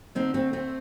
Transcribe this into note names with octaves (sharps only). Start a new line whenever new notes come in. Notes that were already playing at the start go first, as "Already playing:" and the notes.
D3 C4 D#4
D2 A3 C4
D2 A3 C4